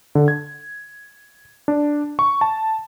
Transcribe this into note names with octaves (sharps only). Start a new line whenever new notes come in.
D3
G#6
D4
C#6
A5